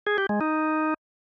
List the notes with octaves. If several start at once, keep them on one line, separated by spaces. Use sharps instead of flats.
G#4
G4
G#3
D#4